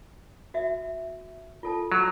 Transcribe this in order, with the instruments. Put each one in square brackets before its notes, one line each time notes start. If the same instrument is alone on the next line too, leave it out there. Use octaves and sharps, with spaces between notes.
[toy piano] F#4 E5
F4 A4 A5
[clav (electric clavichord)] F#3